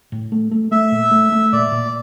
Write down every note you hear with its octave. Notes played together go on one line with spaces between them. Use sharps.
A2
A3
A3
A3 E5
A#2
A3
A3
A#2 D5
A#2